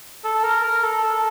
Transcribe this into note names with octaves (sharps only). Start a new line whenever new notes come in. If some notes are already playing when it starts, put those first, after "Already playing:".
A4
A#4
A#4
A4
A4